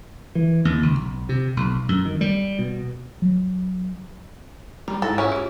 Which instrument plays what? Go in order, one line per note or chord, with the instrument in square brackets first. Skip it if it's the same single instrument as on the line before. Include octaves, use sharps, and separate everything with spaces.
[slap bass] E3
D#2
C#2
B1
C3
B1
F#2
D#3
G3
B2
[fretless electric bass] F#3
[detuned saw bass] G3 [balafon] A#5
[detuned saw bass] G#2 [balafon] D#4 E4 [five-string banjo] A4
[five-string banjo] C#4 E4 [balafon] F4 G#4
[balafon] F4 G4